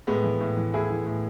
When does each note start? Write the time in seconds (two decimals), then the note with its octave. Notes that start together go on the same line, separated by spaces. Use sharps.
0.07 A2 G#3 B3
0.24 E3
0.40 A2
0.57 E3
0.74 A2 E4 G#4
0.90 E3
1.06 A2